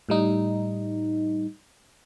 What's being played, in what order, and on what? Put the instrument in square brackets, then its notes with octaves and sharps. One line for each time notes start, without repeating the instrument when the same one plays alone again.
[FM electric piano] A2 G3 D#4